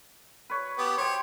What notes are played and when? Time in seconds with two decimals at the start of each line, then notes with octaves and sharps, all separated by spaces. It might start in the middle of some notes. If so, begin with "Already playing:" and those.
0.50 B4 C#5
0.78 B3 G4
0.98 C5 C#5 G5